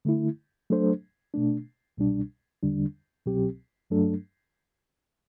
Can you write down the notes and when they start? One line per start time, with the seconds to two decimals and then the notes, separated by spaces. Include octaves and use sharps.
0.05 D3 A3 E4
0.70 F#3 A3 D4 A4 C5
1.34 B2 A3 D4
1.97 C2 B2 G3 D4
2.63 E2 D3 G3 D4
3.26 C2 B2 F#3 C4 G4
3.90 G2 F#3 A3 D4 A4